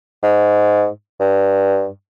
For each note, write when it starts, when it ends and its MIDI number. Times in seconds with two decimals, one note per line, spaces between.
0.23 0.88 44
1.20 1.89 43